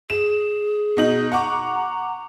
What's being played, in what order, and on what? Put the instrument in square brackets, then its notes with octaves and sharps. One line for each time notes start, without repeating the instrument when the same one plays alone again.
[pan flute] G#4 [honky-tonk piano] E7
[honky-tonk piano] B2 D#4 F#7
[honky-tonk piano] F#5 C#6 D6 [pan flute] A#5